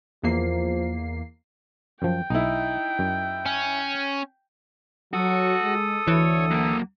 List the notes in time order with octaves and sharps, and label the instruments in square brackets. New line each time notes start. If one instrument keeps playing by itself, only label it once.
[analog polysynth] E2 A#3 C7 [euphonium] F3
[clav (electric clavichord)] F#2 F3 [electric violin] G5
[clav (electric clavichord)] B1 [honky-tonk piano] D#4 E4
[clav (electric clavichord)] F#2
[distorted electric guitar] C#4
[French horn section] F#3 [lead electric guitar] F#4 [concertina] A4 D#6
[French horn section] G#3
[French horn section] D2 [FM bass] E3 [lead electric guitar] C#5
[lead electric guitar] F#3 A#3